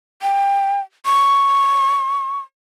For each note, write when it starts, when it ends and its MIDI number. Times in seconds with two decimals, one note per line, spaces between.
0.22 0.81 79
1.06 2.39 85